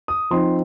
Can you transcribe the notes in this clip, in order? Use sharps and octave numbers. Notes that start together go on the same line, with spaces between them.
D#6
F3 C4 D#4 C6